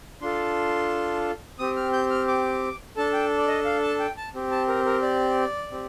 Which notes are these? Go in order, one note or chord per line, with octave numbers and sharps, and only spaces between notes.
D4 F4 A4 C6
C4 G4 D#6
F6
G6
F6
D6
D4 A4 A5
G5
D5
D#5
F5
A5
G5
A5
C4 G4
A5
A#4
A#4
D5
C4 G4